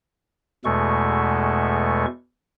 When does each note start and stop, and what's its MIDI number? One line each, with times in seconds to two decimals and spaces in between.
0.65 2.06 40
0.65 2.06 47
0.65 2.06 56
0.65 2.06 57
0.65 2.06 69
0.65 2.06 85